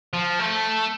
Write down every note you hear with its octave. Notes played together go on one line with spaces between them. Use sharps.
F3
A3